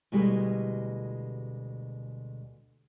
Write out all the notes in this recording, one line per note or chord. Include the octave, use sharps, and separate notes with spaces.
D2 B2 G3 G#3 E4 B4